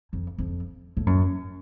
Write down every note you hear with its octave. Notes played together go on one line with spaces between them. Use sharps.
F2
F2
A2
F#2